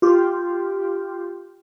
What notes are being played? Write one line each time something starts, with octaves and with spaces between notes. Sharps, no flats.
F4 G4